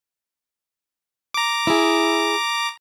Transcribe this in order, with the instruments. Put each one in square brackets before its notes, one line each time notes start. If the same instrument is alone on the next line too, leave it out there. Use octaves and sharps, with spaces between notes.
[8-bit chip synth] A#5 D6
[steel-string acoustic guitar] E4 G#4